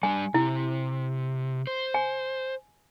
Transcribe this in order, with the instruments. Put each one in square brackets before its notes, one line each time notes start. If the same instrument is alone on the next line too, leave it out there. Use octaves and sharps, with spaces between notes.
[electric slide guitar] G3 D4 [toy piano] G#5
[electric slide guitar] C3 [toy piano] E4
[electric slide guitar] C5
[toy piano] G#5